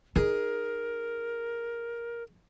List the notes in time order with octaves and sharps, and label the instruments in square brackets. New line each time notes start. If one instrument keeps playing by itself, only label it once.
[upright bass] D#4 [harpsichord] G#4 [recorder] A#4